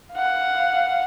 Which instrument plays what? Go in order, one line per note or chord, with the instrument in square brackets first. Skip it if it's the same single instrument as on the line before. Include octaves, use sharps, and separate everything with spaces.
[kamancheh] F5 F#5